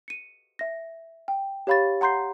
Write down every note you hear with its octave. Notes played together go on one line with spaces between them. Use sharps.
C#7 D#7
E5 A#6
G5
G4 C#5 F5 B5 C#6 A6
F#5 A#5 C6 G6 C7